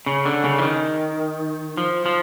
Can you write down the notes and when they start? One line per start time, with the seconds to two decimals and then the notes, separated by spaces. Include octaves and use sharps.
0.06 C#3
0.26 D3
0.44 C#3
0.58 E3
0.62 D#3
1.77 F3
2.06 F3